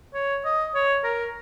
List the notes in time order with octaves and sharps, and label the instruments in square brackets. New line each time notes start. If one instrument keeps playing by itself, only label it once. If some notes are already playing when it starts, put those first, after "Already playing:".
[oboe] C#5
D#5
C#5
A#4